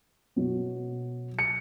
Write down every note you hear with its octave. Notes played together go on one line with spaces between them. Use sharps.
B2 F#3 B3
C#7